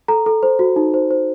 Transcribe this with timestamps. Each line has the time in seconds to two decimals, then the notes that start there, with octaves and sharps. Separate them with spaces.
0.08 A4 A#5
0.26 A4
0.43 C5
0.59 F#4
0.76 D#4
0.94 C5
1.11 C5